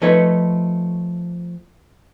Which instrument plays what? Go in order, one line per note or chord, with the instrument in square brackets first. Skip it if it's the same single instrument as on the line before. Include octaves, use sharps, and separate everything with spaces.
[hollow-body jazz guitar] F3 A3 D#4 B4 C#5